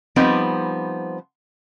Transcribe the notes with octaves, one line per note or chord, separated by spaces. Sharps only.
F3 G3 B3 C4 D#4